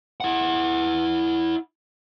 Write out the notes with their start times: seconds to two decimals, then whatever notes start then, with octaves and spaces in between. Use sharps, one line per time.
0.20 E4 F#5